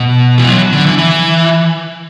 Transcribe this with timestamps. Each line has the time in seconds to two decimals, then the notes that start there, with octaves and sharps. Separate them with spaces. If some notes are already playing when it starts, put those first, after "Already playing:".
Already playing: B2
0.38 E3
0.48 F#3
0.72 D3
0.85 E3
0.98 E3